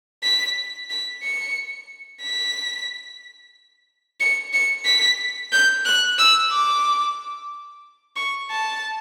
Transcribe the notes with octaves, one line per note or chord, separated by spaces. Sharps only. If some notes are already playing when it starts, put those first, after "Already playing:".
B6
B6
C#7
B6
C#7
C#7
B6
G6
F#6
E6
D6
C#6
A5